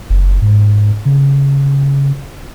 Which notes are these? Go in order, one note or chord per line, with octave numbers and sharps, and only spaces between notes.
F#1
G#2
C#3